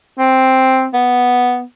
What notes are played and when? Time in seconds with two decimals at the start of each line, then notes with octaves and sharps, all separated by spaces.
0.19 C4
0.94 B3